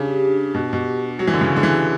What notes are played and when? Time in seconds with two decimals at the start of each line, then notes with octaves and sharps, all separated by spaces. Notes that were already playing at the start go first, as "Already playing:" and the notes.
Already playing: C#3 D4 G4
0.54 B2
0.73 B2
1.19 F#3
1.27 E3
1.34 D3
1.41 C#3
1.56 D3
1.63 E3